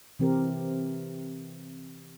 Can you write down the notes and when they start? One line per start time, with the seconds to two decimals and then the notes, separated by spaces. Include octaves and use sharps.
0.19 C3 E3 C4 G4 A#4